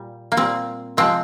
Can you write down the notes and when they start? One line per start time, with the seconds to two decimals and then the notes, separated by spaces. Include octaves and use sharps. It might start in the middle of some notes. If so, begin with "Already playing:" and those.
Already playing: A#2 G3
0.32 A#3
0.37 A#2 G3 C4
0.97 C3 F3 G#3 C4